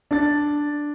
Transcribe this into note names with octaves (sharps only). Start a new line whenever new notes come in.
D4 A6